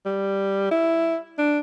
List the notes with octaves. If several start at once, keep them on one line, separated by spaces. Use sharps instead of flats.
G3
E4
D4